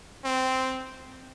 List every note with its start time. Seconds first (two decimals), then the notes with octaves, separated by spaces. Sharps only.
0.25 C4